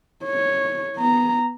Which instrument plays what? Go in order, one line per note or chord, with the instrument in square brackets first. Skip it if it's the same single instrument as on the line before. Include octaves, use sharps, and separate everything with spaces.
[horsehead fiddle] C#5
B3 A#5